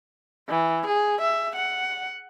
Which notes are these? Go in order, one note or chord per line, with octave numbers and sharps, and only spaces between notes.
E3
G#4
E5
F#5